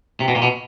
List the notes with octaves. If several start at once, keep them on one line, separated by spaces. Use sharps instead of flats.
C3
B2
A#2
B2